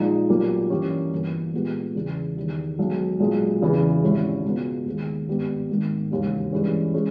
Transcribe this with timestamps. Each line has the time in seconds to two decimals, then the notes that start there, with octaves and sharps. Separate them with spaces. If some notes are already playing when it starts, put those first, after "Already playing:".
Already playing: A#1 A#2 G#3 D#4
0.29 B1 A#2 G3 A#3
0.70 G2 E3 A#3 C#4 G4
1.12 G1 G2 E3 A#3
1.54 A#2 G#3 B3 G4
1.95 E2 C#3 E3
2.36 E2 D#3 G3
2.78 B1 B2 G#3
3.20 B1 A#2 G#3
3.62 E2 C#3 E3
4.02 G#1 G#2 G3 C#4 E4
4.45 C#2 B2 G#3 B3
4.86 D#2 D#3 G#3
5.28 G#1 G2 G3 B3
5.69 G#1 G#2 D#3 A#3
6.11 E1 D#2 C#3 G3
6.52 G2 E3 G#3 C#4
6.94 G#3 C#4